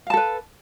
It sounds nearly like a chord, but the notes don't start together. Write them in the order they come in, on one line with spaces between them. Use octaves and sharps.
F5 A5 A4 B4